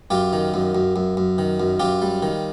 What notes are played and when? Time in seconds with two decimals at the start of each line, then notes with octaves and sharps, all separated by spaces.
0.10 F#2 F4 G4
0.33 D#3
0.54 F#2
0.75 F#2
0.96 F#2
1.17 F#2
1.38 D#3
1.60 F#2
1.80 F#2 F4 G4
2.02 G3
2.23 D#3